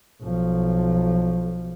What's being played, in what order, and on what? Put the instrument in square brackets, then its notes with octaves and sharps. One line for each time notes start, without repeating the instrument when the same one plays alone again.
[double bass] B1 F3